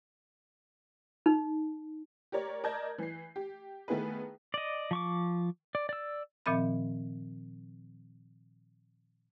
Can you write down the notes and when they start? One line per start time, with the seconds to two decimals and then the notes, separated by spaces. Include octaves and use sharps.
1.26 D#4
2.32 G4 A#4 C#5 D5
2.64 A#4 D5 D#5 A5 G6 G#6
2.98 E3 C7
3.36 G4
3.88 D#3 A3 B3 E4 G#4 B4
4.54 D5 D#5
4.91 F3 C#6 D6
5.75 D5
5.89 D5 E6
6.46 A#2 D#3 F3 C4 E5 B5